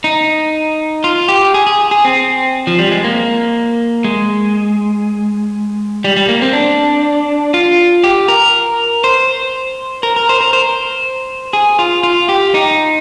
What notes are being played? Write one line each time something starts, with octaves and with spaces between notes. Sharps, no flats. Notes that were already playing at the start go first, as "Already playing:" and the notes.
D#4
F4
G4
G#4
G#4
G#4
C4
F3
G3
G#3
A#3
G#3
G3
G3
A#3
C4
D4
F4
G4
A#4
C5
A#4
A#4
C5
A#4
C5
G#4
F4
F4
G4
D#4